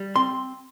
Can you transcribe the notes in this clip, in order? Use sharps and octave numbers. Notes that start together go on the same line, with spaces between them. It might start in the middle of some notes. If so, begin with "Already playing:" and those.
Already playing: G3
C4 C6